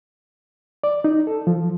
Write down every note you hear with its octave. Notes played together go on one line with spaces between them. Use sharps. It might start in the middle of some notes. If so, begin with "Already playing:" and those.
D5
D#4
A4
F3